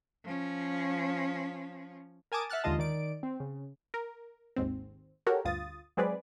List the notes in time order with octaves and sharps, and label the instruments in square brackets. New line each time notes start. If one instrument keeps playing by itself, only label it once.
[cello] F3 C#4
[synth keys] A#4 G#5 A5 D6 D#6
E5 F#5 F6 F#6 A6
D#2 D3 G#3 F4 D#5 A5
D#3 D5 D7
C4
C#3
[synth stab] A#4
G#1 D#2 G#2 C4
F#4 G4 A4 A#4 C#5
D2 G2 F4 D#6 A6
F#3 G#3 C4 G#4 B4 D5